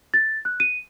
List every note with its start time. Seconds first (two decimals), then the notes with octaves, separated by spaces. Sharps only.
0.14 A6
0.45 F#6
0.60 D#7